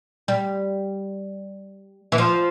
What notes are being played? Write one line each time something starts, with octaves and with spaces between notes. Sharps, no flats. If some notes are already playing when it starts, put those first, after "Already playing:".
G3
E3
F3